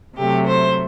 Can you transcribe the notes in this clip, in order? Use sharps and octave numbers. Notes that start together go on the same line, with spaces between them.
C3 F#3 A3 G4
C5